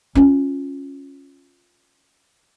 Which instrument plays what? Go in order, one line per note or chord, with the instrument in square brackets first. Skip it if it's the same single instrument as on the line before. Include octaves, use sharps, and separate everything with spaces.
[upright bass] C#4 F4